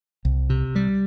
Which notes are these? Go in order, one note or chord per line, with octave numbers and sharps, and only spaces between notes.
C2
C3
G3